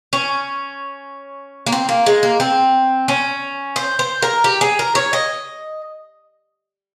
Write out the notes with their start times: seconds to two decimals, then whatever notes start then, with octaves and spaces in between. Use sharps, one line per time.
0.13 C#4
1.66 A#3
1.72 C4
1.89 A#3
2.06 G#3
2.23 A#3
2.40 C4
3.08 C#4
3.76 C5
3.99 C5
4.22 A#4
4.44 G4
4.61 G#4
4.79 A#4
4.95 C#5
5.13 D#5